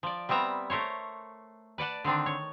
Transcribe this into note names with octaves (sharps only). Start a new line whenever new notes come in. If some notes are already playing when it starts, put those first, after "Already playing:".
F3 D5
G3 B3 C4 E5 A#5
A3 A#4 C5 C#5
B4 D5 F#5 A5
D3 D#3 C4 D4
C#5